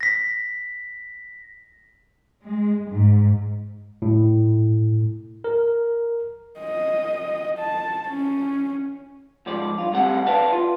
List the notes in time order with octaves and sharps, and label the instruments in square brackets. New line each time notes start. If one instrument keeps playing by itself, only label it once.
[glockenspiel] A#6 B6
[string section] G#3
G#2
[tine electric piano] A2
A#4
[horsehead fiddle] D#5
A5
C#4
[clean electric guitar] G#2 F3 D5
G2 F4
D2 G2 C3 F#5
B4 D5 E5 F5 G5 A5
F4